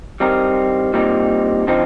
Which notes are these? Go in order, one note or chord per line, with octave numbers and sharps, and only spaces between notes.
G3 C4 D#4 A#4
A#2 G3 C4 D#4
D3 F3 C4 D#4